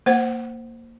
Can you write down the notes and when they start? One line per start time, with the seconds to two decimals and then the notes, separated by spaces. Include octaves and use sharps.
0.06 A#3 C5 F#5